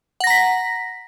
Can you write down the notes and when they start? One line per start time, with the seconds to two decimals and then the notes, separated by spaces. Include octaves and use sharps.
0.20 F#5
0.24 A#6
0.27 A#5
0.30 B6